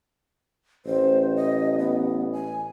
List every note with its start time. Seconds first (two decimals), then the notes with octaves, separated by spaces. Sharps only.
0.86 A1 C5
1.36 D#5
1.79 B3
2.33 G#5